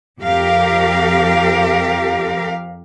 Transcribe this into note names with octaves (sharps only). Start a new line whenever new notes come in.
F2 F3 G4 A#4 F5